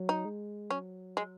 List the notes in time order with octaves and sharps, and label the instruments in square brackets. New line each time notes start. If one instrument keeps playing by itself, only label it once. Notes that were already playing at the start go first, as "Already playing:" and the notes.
Already playing: [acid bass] F#3
[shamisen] D#4
[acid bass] G#3
[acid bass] F#3 [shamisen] C#4
[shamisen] G#3